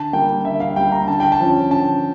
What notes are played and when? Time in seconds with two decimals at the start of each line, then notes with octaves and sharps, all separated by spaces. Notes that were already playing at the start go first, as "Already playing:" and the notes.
Already playing: D3 A5
0.13 G3 A#3 G5
0.45 D3 E5
0.60 F5
0.76 G3 A#3 G5
0.92 A#5
1.08 D3 A5
1.20 G5
1.32 A5
1.40 F3 C#4
1.71 D3 A5